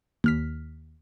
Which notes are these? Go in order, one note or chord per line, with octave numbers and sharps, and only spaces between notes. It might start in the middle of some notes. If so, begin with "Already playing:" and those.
D#2 F6 B6